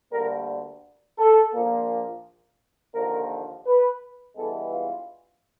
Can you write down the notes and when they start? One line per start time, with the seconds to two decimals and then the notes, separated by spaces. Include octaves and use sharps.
0.12 D2 D3 G3 A#3 A#4
1.19 A4
1.54 A#1 A#2 F3 A#3
2.94 D#2 D3 F3 A#3 A#4
3.66 B4
4.36 G2 E3 G#3 B3 A4
4.72 F4